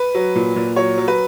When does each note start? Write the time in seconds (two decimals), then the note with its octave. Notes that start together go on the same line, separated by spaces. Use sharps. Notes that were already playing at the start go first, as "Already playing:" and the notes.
Already playing: B4
0.15 F#3
0.35 A#2
0.56 A#2
0.76 F#3 C#5
0.97 F#3
1.08 B4